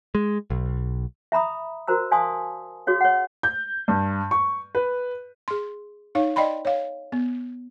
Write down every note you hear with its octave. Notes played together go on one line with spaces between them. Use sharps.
G#3
B1
E5 A#5 B5 D#6
F#4 A#4 C5 A#5 E6
D5 F5 G#5 A5 C6 D#6
F#4 G#4 C#5 F5
C#5 F#5
G6
G2
C#6
B4
G#4 C6
D#4 C#5 F5
D5 D#5 G5 B5 C6
C#5 F5
B3